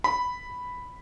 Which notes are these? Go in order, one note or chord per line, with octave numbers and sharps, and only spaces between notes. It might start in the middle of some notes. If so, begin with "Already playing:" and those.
B5